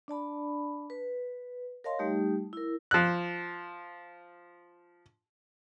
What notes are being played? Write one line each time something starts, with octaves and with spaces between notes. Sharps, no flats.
D4 D5 A5 B5
B4
A#4 C#5 D#5 F5 A5 C6
G3 A3 D#4 G4
E4 A#4
F3 F#6